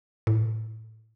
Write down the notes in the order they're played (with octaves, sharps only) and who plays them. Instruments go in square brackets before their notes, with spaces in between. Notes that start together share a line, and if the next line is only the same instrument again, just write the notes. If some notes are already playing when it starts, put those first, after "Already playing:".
[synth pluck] A2